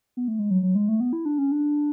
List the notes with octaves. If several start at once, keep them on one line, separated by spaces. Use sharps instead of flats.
B3
A3
G#3
F#3
F#3
G#3
A3
B3
E4
D4
C#4
D4